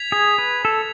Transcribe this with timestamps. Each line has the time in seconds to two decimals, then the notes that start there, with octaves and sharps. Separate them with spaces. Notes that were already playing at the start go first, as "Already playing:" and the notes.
Already playing: G#6 B6 F7
0.12 G#4
0.38 B4
0.65 A4